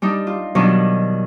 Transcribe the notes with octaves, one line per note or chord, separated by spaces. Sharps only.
G3 D4 D#4
F4
B2 D#3 F#3 G3 D4